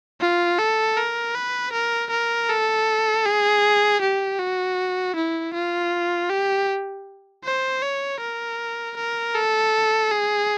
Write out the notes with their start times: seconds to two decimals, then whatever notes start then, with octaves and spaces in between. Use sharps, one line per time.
0.21 F4
0.59 A4
0.97 A#4
1.35 B4
1.73 A#4
2.11 A#4
2.49 A4
3.26 G#4
4.02 G4
4.40 F#4
5.16 E4
5.54 F4
6.30 G4
7.44 C5
7.82 C#5
8.21 A#4
8.97 A#4
9.35 A4
10.11 G#4